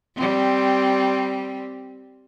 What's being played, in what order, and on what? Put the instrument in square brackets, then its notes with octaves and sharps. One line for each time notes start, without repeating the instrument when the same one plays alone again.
[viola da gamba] G3 C4